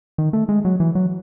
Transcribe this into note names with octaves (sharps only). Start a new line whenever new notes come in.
D#3
A3
G#3
F#3
E3
F#3